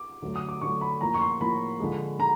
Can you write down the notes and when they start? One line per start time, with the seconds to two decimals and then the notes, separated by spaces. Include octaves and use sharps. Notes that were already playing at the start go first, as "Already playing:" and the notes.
Already playing: D6
0.22 D3 F#3 A3
0.36 D#6
0.49 D6
0.61 D3 F#3 A3 C#6
0.81 B5
1.01 A2 F3 A#3 A#5
1.14 C#6
1.21 C6
1.41 A2 F3 A#3 B5
1.80 D3 F3 G#3
2.19 D3 A#5